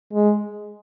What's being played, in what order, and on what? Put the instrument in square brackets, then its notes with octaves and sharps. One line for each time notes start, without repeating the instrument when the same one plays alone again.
[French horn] G#3